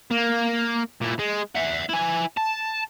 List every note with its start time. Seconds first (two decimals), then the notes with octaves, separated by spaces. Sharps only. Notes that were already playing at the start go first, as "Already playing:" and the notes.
0.11 A#3
1.02 A#2 E4
1.19 G#3
1.55 E5 F#5
1.89 E4 G#5
2.37 A5